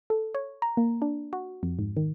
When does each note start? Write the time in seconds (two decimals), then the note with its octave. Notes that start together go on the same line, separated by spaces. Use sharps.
0.10 A4
0.34 C#5
0.62 A#5
0.77 A#3
1.02 D4
1.33 F#4
1.63 F2
1.79 G#2
1.97 D#3